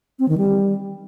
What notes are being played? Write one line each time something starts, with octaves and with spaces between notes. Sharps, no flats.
C4
D#3
G3